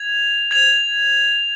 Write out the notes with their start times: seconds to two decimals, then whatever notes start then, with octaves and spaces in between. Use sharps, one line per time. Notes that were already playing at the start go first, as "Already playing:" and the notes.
Already playing: G#6 F7
0.51 G#6 F7